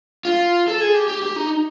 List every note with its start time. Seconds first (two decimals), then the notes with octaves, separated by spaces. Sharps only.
0.25 F4
0.68 A4
0.81 G#4
0.94 G4
1.08 G4
1.22 G4
1.36 D#4